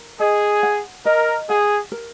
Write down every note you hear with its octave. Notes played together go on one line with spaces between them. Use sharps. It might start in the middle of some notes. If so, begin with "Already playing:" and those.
Already playing: A#4
G#4 D#5
F#5
A#4 D#5
G#4 F#5
A#4